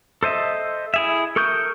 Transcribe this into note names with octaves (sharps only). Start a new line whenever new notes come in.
A4 C5 D#5 E5
E4 G#4 E5
A4 A#4 C#6 D#6 G6